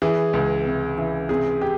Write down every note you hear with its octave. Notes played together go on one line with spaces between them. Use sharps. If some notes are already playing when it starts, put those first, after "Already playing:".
E3 G#4
C#2
C3
E3
C3 G#4
G4